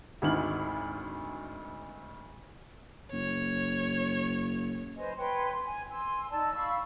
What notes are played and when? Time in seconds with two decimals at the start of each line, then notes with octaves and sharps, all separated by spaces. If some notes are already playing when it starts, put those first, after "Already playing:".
0.22 G#1 D2 D#3 E4 F6 F#7
3.13 F#1 C#5
4.96 B4 C5 D#5 G#5
5.16 B4 C#5 G5 C6
5.64 G#5
5.89 G#5 C6 E6
6.30 D#4 D5 A5 E6
6.54 F5 B5 C#6 E6